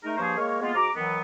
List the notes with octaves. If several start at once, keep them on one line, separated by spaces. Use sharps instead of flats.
G#3 A3 D#4 A#4
G2 F3 A#3 G#4 C5 C#5
G#3 A#3 A#4 C#5
G#3 A#3 B3 F4
G#2 F#4 A#5 D6
D#3 E3 F#3 B3